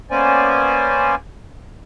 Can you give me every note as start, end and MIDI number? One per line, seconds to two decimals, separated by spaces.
0.11 1.15 58
0.11 1.15 59
0.11 1.15 61
0.11 1.15 72
0.11 1.15 74
0.11 1.15 80